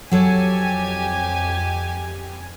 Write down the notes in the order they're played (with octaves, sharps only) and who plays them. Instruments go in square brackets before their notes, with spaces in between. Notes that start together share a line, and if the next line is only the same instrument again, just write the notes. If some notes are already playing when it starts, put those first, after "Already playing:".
[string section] F2 G4 G#5 [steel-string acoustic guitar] F#3 A4 C#5